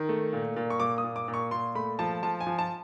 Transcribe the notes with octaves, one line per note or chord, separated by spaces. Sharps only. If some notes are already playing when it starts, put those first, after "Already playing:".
Already playing: D#3
A3
A#2
A#2
C#6
A#2 D6
D#6
A#2
D6
A#2
C#6
A#2 C6
A3 B5
F3 A5
F3 A5
G#5
F3
A5